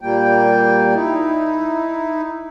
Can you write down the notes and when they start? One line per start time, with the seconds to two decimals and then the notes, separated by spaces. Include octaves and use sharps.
0.01 A#2 G3 A#3 G5
0.94 D#4 E4